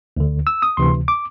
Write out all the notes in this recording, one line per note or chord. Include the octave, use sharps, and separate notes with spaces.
D2 D3
E6
D#6
D2 C3 E3 C6
D6